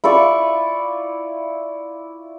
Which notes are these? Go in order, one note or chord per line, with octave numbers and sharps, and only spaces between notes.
E4 F4 D5 C#6